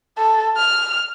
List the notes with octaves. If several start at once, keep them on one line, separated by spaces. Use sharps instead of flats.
A4
F6